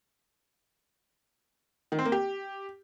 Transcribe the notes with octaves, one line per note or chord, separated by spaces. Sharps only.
D#3
C4
A#3
G4